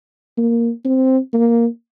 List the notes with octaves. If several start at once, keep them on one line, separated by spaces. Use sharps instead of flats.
A#3
C4
A#3